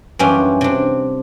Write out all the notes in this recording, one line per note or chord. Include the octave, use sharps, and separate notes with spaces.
F#2 E3 G3 C#4 D4 F4
C3 D4